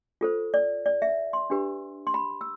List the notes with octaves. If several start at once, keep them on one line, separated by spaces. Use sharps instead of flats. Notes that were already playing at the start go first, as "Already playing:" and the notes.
F4 A4 C5
D5
D5
E5
C6
D4 G4 B4
C6
B5
E6